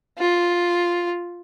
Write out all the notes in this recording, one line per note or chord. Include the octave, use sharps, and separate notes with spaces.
F4